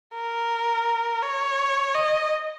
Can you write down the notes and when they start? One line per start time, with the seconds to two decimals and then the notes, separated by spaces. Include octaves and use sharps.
0.14 A#4
1.23 C#5
1.94 D#5